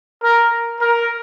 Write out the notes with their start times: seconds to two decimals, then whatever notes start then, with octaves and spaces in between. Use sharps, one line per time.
0.23 A#4
0.81 A#4